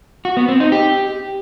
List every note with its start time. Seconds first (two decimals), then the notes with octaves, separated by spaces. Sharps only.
0.25 F#4
0.37 B3
0.48 C4
0.60 D#4
0.72 G4